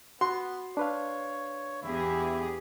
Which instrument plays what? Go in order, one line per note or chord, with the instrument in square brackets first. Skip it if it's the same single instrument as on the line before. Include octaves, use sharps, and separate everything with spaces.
[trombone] B3 [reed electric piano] F#4 [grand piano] C6
[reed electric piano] D4 B4 F5 [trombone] C#5
[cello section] E2 G4 G#4 [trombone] E4